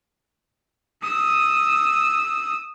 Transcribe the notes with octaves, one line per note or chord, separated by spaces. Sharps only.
D#6 E6